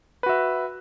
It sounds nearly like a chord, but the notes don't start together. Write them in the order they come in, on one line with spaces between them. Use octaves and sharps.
B4 F#4 E5